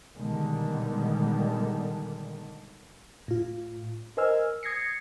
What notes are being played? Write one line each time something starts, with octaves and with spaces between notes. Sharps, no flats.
B2 D3 D#3 G3 G#3
A2 F4
A#4 C5 D#5 G#5 E6 F6
D#6 G#6 A#6 C7 C#7